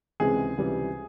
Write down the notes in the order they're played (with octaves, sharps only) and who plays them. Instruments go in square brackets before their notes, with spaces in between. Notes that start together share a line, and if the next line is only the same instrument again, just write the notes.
[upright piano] C#2 C3 E3 G#3 C4 [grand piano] G#4
[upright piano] C#2 C3 E3 G3